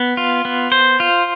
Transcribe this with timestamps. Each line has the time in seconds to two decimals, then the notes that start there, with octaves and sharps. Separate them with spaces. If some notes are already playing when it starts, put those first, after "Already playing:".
Already playing: B3
0.17 F4
0.45 B3
0.72 C5
1.00 F4